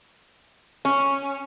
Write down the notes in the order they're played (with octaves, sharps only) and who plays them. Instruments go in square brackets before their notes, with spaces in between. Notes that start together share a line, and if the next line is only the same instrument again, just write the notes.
[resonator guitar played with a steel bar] C#4